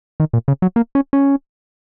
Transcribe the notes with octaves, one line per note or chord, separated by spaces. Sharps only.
D#3
A#2
C#3
F#3
A#3
C#4
C#4